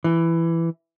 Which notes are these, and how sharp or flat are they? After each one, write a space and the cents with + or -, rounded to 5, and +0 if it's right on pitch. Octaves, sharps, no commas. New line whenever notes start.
E3 +10